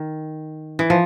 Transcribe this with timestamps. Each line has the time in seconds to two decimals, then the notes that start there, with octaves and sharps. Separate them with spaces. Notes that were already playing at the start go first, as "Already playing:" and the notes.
Already playing: D#3
0.79 E3
0.90 F3